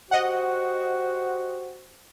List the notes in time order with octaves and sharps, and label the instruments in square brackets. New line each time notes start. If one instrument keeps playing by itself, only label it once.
[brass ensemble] F#4 G4 C5 [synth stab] D#5 F#5